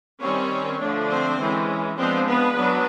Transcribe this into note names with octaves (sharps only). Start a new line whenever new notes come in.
D#3 G3 C4 C#4 C#5
D3 F3 A3 D4
C4 C5
E3 G#3 C#4
F3 G#3 B3 C4 D4 C5
B3 B4
F#3 B3 D4